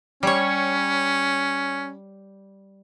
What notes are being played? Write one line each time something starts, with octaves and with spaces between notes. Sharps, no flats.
G3 C#4 C#5